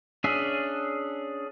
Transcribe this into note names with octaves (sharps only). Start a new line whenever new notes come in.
C#4 D4 G#4 E5